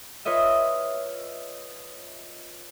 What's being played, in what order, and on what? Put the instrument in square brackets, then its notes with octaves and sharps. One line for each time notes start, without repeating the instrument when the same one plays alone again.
[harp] F4 B4 C#5 D#5 E5